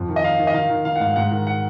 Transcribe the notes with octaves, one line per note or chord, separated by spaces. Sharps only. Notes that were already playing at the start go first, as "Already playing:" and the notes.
Already playing: F2
D#3
D#5
D#3 F5
D#3
D#5
D#3 F5
D#3
D#3 F5
F#5
G#2 F5
G#2 F#5
D#3
F#5